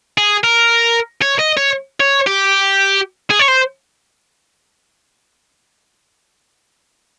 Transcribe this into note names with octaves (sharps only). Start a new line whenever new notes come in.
G#4
A#4
C#5
D#5
C#5
C#5
G4
G#4
C#5
C5